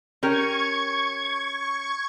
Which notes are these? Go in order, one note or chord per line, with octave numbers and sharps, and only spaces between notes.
C#4 G4 A#4 C#6 G#6